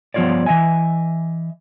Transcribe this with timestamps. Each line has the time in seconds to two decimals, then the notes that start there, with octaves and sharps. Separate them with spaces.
0.14 G2 F3 B3 F4 C#5 D5
0.46 E3 D#5 E5 G#5